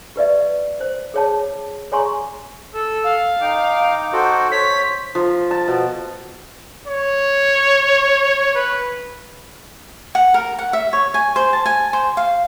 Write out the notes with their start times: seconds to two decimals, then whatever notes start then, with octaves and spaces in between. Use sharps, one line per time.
0.16 G4 B4 D5 E5
0.80 C5
1.14 G#4 C#5 A5
1.92 G#4 C#5 G#5 A#5 C6 C#6
2.74 A4 E6
3.04 F5
3.41 D#4 G5 D6
4.13 F#4 A4 C5
4.52 C5 C#5 B6
5.15 F3
5.51 A5
5.68 B2
6.87 C#5
8.55 B4
10.15 F#5
10.34 A#4
10.59 F#5
10.73 E5
10.93 C#5
11.14 G#5
11.36 C5
11.53 A5
11.66 G#5
11.93 C5
12.17 F5